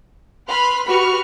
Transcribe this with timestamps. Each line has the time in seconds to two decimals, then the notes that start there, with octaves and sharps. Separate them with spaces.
0.49 B4 B5 C6 F6
0.86 F#4 G4 B4 B5 C#6 F6